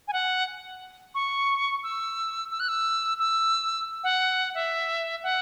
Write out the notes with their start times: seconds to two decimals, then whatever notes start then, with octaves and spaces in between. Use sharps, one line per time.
0.08 G#5
0.13 F#5
1.15 C#6
1.83 E6
2.51 E6
2.60 F#6
2.69 E6
3.19 E6
4.04 F#5
4.55 E5
5.23 F#5